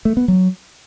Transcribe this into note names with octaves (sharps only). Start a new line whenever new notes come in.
A3
B3
F#3